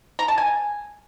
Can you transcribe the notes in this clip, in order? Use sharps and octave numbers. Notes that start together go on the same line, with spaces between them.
A#5
A5
G#5